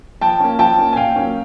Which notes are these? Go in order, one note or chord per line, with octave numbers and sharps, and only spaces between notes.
F3 G5 A5
A#3 C#4
F3 G5 A5
A#3 C#4
G#5
A#2 F5 G5
F#3 A#3 C#4